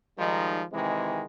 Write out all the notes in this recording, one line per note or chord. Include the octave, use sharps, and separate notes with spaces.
D#3 F3 G3 G#3 D#4
C3 D#3 E3 G#3